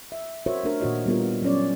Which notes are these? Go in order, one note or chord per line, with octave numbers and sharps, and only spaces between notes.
E5
F#4 A#4 C5 C#5 E5
A3 D4 A#4
A#2 D#3 F#4 C#5 D#5
G3 B3 F4 A#4
F#3 B3 C#4 C#5 D5